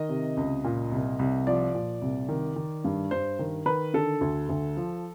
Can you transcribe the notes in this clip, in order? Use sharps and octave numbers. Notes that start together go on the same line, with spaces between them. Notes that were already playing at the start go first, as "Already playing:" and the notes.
Already playing: D#3 D#5
C3
C#2
A#2
C2
C2
F3 D5
A#2
C2
D#3
D#3
G2
G2 C5
D#3
D#3 B4
D3 A4
D2
D2
F3